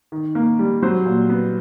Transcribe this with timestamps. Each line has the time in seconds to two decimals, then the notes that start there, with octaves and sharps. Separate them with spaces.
0.12 D#3
0.35 A#3
0.59 G3
0.82 F#3 C5
1.06 A#2
1.30 B3